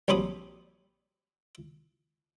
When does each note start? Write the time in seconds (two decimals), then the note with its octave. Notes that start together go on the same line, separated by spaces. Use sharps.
0.08 A#1 F#3 C4 G4 B5 D#6